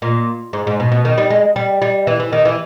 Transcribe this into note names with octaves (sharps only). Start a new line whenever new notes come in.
A#2
G#2
G#2
B2
B2
D#3
G3
G#3
G3
G3
E3
E3
D#3
E3